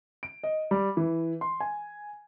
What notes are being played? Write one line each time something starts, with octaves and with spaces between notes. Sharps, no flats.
D7
D#5
G3
E3
C6
G#5